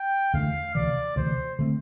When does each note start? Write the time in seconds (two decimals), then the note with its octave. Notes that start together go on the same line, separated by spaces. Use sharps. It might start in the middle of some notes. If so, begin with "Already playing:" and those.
Already playing: G5
0.34 E2 D3 A3 D4 F5
0.75 D2 C3 E3 D5
1.16 D2 C3 E3 C5
1.59 D3 A3 C4